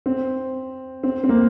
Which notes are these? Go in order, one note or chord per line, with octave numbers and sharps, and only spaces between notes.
C4
C4
C4
A#3